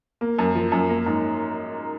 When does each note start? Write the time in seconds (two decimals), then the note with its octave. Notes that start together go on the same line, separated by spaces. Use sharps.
0.21 A#3
0.39 F#2
0.55 F3
0.72 F#2
0.89 A#3
1.06 G#2